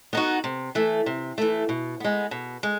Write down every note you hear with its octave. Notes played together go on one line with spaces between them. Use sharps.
B3 D#4 F#4
C3
E3 A3
C3
E3 A3
B2
G#3 B3
B2
G#3